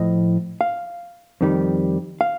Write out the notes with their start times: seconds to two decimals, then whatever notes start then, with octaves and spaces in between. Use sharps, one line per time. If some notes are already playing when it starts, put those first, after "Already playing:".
Already playing: A2 F3 D#5
0.61 F5
1.41 F2 D#3 G3
2.21 F5